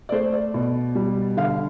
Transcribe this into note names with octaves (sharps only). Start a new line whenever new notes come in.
D5
A3 C5
D5
B2
G3
D3 F5